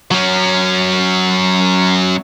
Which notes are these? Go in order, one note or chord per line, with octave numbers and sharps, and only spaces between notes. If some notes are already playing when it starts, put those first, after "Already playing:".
F#3 C#4